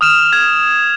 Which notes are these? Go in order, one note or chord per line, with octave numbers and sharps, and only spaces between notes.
D#6 F6 E7 F7
G#6